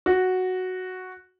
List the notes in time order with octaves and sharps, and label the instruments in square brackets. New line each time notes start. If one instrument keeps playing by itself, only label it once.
[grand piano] F#4